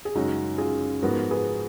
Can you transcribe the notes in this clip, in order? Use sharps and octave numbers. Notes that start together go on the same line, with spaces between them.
G#4
F#2 C#3 G#3 C#4 D#4 F#4
F4 G#4
G#2 F3 B3 F#4 A#4
G#4 B4